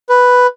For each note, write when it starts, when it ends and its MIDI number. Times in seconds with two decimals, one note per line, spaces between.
0.09 0.47 71